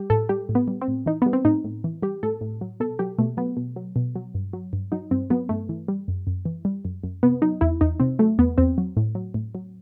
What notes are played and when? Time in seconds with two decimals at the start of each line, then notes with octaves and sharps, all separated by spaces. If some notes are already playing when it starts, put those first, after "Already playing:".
Already playing: G3 G4
0.10 A2 A4
0.29 G3 G4
0.49 A2
0.55 B3
0.68 G3
0.81 C4
0.88 A2
1.06 E3 D#4
1.22 G3 B3
1.33 C4
1.45 A2 D#4
1.64 A2
1.84 E3
2.02 G3 G4
2.23 A2 A4
2.41 A2
2.61 F#3
2.80 B2 A4
2.99 F#3 G4
3.18 B2 A3
3.37 F#3 B3
3.57 B2
3.76 F#3
3.96 B2
4.16 F#3
4.35 G2
4.53 F#3
4.73 G2
4.92 F#3 D#4
5.11 G2 C4
5.30 F#3 B3
5.49 G2 A3
5.69 E3
5.88 G3
6.08 F#2
6.27 F#2
6.45 E3
6.65 G3
6.85 F#2
7.04 F#2
7.23 C3 B3
7.42 F#3 D#4
7.61 E2 E4
7.81 E2 D#4
8.00 C3 C4
8.19 F#3 A3
8.39 E2 B3
8.58 E2 C4
8.78 F#3
8.97 A2
9.15 F#3
9.34 A2
9.55 F#3